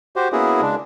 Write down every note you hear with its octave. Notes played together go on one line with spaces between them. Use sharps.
F#4 G4 C5
A#3 B3 C#4 E4 F#4 G#4
C#3 G#3 D4